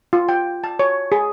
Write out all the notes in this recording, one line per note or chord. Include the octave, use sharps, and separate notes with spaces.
F4
G5
A5
C#5
G#4